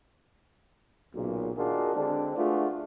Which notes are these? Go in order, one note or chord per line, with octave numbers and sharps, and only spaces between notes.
B1 A#2 C#3
D#3 A#3 D4 F4 F#4 G#4
D3 G#3 C4 D4
A3 D4 F4 F#4 G#4 B4